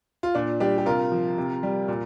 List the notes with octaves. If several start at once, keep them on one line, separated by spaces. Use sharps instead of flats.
F4
A#2 D4
G3 D4 G4
G4
C3 F4 A#4
F3
C3
G3
A#2